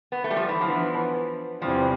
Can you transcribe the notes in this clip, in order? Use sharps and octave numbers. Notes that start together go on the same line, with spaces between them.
B3
A3
G3
F3
E3
E3 F3 B3 D4
E2 C3 E3 F3 G3 C4